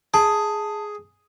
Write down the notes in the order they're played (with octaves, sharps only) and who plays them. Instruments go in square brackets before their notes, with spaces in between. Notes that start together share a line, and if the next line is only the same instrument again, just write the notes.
[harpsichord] G#4 [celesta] A5